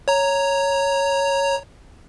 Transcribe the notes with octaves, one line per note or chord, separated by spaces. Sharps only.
C#5 A#5